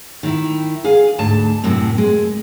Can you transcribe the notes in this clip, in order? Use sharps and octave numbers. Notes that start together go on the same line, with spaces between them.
D#3 E4
G#4 F5 G#5
D2 G#2 A5
F#2 A2 C3 C4
G#3